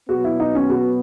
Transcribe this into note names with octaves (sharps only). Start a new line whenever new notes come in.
B2 F#3 B3 F#4
E4
D#4
C#4
F#4